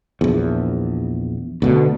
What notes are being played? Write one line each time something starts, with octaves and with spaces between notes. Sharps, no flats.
A#1 E2
D2 B2 D3